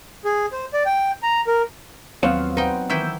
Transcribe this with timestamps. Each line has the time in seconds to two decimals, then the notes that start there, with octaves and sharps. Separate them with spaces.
0.25 G#4
0.52 C5
0.73 D5
0.86 G5
1.23 A#5
1.47 A#4
2.23 D#2 F3 F#3 B3 C4 C#5 F5
2.57 D#4 B4 C5 F#5 G5
2.90 D#3 E3 E4 E6 G6